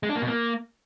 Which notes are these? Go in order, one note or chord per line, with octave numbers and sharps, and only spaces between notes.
G#3
D4
A#3
B2
A#3